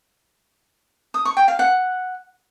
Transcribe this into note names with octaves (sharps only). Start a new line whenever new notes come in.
D#6
C#6
G5
F5
F#5